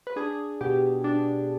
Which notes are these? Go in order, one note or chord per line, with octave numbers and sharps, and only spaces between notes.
B4
D4 G#4
B2 G4
D4